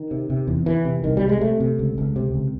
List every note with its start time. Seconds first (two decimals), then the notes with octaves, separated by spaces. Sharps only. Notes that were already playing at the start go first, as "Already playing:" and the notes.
Already playing: D#3
0.11 C3
0.30 C3
0.48 E2
0.66 E2 E3
0.85 C3
1.04 C2 D#3
1.17 G3
1.22 C3
1.29 G#3
1.41 C3 A3
1.60 C3
1.79 C#2
1.98 C#2
2.16 C3
2.34 C#2